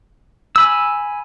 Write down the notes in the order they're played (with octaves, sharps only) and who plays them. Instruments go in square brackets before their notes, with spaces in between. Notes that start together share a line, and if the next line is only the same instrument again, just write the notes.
[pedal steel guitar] G#5 B5 E6